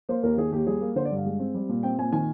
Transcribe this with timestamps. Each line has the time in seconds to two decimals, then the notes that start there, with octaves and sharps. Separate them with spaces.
0.09 A#3 C5
0.23 D#2 A#4
0.37 D#3 G#4
0.52 D#2 G4
0.67 G3 G#4
0.81 A#3
0.96 D3 C5
1.05 D5
1.11 G2 F5
1.26 G#3
1.39 C4
1.54 G3
1.69 A#2
1.83 C4 G5
1.98 A#2 G#5
2.12 D#3 G#5